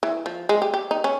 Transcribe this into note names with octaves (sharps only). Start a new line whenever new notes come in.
E3
F3
G#3
G4
G4
D#4
C#4